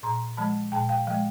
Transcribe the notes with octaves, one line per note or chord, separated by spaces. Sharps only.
A#2 A#5 C6
F3 G#3 A5 B5
A#2 G5 A5
F5 G5
F3 G#3 F5 G5